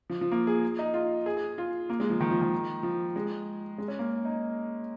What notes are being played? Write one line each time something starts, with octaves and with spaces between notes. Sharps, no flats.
F3
F3
A#3
G#4
D#4
F4
G#4
G#4
F4
A#3
G#3
F3
D#3
F3
D#3
F3
G#3
G#3
C#4
A#3
D#4